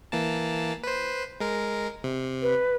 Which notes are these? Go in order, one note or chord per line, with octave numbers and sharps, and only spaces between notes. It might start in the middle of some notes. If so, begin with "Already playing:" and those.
E3 A#3 A5
B4 C5
G#3 A#4
C3
B4